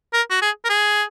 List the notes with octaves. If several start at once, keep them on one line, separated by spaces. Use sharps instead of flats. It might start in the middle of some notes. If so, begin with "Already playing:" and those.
A#4
F#4
G#4
A#4
G#4